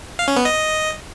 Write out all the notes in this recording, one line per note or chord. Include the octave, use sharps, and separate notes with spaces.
F5
C#4
B3
D#5